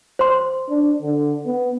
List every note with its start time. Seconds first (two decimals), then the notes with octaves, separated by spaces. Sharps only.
0.19 C5 C6
0.69 D4
1.02 D3
1.46 B3